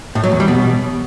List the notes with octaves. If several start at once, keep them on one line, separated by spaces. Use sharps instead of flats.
A2
F#3
E2
G3
B2